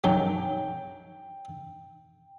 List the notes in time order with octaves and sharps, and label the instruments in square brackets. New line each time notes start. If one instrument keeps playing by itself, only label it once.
[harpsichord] F#2 D#3 F#3 [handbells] G5